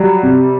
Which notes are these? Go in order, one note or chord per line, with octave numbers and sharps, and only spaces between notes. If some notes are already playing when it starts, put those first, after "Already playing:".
Already playing: F#3 G3
C3